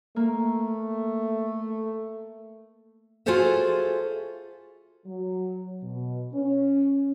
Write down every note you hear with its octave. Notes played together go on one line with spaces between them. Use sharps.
A3 A#3
F4 F#4 G#4 A4 C5 E5
F#3
B2
C#4